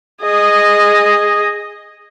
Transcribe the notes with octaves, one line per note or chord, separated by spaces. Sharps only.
G#4 D#5